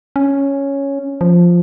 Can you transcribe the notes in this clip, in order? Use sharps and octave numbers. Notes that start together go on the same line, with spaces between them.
C#4
F3